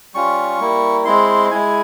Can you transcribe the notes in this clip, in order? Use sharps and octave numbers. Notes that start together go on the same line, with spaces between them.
G3 C#4 F4 C#6
G3 A#3 E4
G#3 C4 E4 C6
G#3 E4 G#5